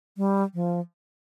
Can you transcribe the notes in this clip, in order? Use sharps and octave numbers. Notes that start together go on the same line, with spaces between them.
G3
F3